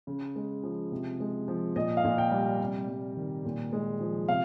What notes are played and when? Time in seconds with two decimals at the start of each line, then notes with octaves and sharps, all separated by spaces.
0.07 C#3
0.36 G#3
0.63 F3
0.92 C3
1.20 G#3
1.48 F3
1.76 A#2 D#5
1.97 F5
2.05 A#2
2.18 G5
2.31 G3
2.61 C3
2.88 G3
3.17 D#3
3.45 A#2
3.73 G#3
4.01 F3
4.29 C3 F5